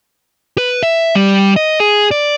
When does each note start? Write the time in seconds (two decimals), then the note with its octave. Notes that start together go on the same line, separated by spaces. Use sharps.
0.58 B4
0.83 E5
1.15 G3
1.56 D#5
1.80 G#4
2.11 D5